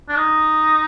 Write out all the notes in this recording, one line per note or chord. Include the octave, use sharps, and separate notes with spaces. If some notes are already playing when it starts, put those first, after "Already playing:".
D4
D#4